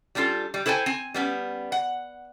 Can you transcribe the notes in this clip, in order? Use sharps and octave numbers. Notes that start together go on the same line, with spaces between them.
G3 C#4 D4 F4 A4
G3
E4 A4 C5 G5 G#5
C4 G#5
G3 B3 C#4
F#5